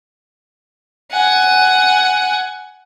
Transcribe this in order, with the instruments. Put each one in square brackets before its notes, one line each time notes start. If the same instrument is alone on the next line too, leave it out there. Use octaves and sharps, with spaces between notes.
[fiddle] F#5 G#5